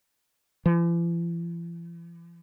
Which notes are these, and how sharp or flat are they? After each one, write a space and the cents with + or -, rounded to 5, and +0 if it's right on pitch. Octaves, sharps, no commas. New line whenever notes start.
E3 +45